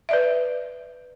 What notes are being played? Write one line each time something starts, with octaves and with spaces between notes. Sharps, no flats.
B4 D5 E5